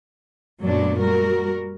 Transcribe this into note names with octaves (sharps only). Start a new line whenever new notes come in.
F#2 A#2 F#3 A3 B3 D4
G3 F#4 A#4